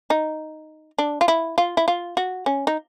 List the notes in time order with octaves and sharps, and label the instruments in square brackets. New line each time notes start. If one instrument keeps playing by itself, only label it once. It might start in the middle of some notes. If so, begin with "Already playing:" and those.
[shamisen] D#4
D4
F4
E4
F4
E4
F4
F#4
C#4
D#4